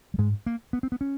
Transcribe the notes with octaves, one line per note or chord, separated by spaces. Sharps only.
G3
G#2 G#3
A#3
B3
C4
B3
C#4